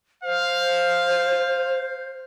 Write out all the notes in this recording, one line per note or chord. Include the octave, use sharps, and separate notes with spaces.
C5 F5